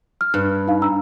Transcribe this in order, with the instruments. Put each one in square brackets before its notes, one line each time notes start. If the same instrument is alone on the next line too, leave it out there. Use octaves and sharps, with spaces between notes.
[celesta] F6
[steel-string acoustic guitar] G2
[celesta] D#4 F5
D4 A#5 E6